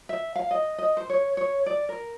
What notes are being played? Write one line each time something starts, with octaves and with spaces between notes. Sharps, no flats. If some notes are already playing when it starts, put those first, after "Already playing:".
E5
F5
D#5
D#5
C5
C#5
C#5
D5
A#4